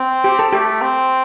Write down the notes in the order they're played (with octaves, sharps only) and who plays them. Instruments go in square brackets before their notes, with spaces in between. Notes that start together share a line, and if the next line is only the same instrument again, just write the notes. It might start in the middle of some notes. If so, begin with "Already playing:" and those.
Already playing: [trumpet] C4
[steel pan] G4
A4
[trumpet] A3 [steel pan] G4
[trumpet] C4